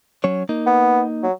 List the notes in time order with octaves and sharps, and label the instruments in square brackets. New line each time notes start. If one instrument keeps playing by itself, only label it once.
[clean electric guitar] F#3 C#4 C#5
A#3 D#4
[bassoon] B3
F#3